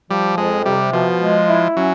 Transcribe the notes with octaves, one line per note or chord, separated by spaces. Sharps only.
F3 G3
F2 G#3
C3 G3
B2 F3
G#3
E4
F#3 C#4